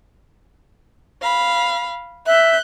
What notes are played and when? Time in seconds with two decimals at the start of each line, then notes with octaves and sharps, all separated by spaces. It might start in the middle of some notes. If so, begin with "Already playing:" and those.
1.22 F5 B5
2.27 E5 F#6 G6